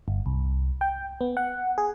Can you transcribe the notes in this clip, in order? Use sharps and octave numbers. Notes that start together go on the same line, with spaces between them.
G1
C2
G5
B3
F#5
G#4